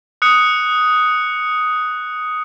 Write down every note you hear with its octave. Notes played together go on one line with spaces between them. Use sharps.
D#6 F#6 C#7